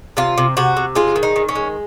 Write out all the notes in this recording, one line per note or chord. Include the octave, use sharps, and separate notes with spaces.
C3 F4
C3
C3 F#4
C3
G#3 F4
D#3
D#4
D#3
C#4
G#3